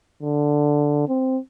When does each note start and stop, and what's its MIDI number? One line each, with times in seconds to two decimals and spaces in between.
0.23 1.08 50
1.09 1.38 60